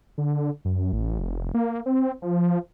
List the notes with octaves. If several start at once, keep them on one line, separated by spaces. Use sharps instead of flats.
D3
F#2
A1
F1
A#3
C4
F3